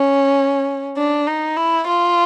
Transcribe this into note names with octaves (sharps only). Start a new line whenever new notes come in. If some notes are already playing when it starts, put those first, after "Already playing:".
Already playing: C#4
D4
D#4
E4
F4